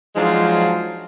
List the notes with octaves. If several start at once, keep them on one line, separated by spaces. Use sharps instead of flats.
F3 F#3 G#3 D4 D#4 F5